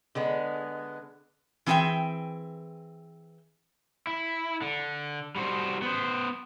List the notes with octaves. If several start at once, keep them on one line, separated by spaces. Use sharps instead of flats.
D3 G#3 B3
E3 C4 G#4 A4 E5 G5
E4
D3
G3 F#4 C5
B3 C5